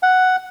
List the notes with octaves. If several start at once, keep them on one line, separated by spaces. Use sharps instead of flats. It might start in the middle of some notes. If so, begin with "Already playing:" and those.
F#5